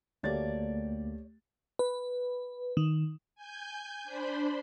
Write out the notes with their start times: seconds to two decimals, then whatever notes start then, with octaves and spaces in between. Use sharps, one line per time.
0.23 D2 A3 A#3 G4 C#5 D5 A6
1.79 B4
2.77 D#3
3.35 G#5 G6
4.04 D4 C5 B5 C6